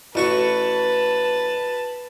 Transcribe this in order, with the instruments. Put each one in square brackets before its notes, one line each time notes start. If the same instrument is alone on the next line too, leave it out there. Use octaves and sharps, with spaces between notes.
[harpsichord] A1 F#4 C#6 [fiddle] B4 A5